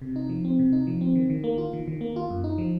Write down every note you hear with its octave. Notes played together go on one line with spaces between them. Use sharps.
C3
D#4
F3
C4
C3
D#4
F3
C4
D#3
D#3
A#3
F4
D#3
D#3
A#3
F4
F#2
D#4
F3